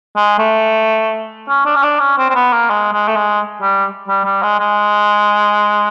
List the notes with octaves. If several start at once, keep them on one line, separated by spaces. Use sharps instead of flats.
G#3
A3
C#4
D4
C#4
D4
C#4
C4
C4
B3
A#3
G#3
G#3
A3
G#3
G3
G3
G3
G#3
G#3